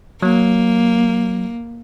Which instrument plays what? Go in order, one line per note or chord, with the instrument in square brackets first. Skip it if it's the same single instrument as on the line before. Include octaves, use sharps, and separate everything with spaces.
[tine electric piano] F#3 [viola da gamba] A#3